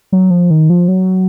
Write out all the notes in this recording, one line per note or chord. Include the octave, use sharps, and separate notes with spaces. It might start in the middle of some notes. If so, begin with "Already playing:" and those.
F#3
F3
D#3
F3
F#3